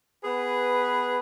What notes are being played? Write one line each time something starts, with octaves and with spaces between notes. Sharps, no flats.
B3 G#4 B4